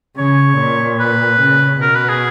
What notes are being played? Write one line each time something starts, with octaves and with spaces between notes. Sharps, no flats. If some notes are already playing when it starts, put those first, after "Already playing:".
C#3 C#5
A#2
B4
C#3
B2 A#4
B4
G#4